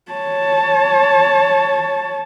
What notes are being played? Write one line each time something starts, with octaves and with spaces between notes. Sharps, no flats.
C#5 A5